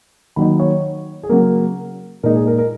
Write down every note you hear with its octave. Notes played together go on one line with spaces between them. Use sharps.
D#3 F#3 A#3 D#4 B5
C#5
G#4
C#3 F#3 A#3 A#4
A#2 G#3 D#4 A#4
G#4
A#4
A#4